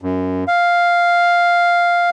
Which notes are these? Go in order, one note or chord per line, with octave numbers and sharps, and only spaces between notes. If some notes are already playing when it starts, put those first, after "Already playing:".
F#2
F5